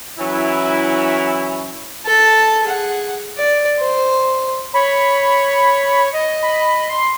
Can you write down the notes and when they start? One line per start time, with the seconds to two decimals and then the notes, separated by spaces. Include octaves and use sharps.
0.19 E3 F#3 C#4 E4
2.06 A4 A5
2.64 G#4 F#5
3.37 D5
3.79 C5
4.74 C#5 B5
6.13 D#5
6.43 B5
6.89 C6